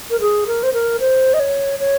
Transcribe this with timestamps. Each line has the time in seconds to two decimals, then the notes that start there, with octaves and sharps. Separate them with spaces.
0.11 A#4
0.21 G#4
0.47 A#4
0.63 C5
0.73 A#4
1.00 C5
1.34 D#5
1.40 C#5
1.80 C#5